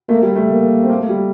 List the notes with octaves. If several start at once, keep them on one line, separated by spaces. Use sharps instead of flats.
A3 A#3
G3
A3
A#3
C4
A#3
A3
G3